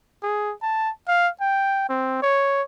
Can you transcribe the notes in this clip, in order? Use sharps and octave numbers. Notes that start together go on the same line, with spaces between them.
G#4
A5
F5
G5
C4
C#5